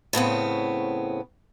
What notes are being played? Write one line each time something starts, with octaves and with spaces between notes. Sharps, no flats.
A2 C#3 B3 C4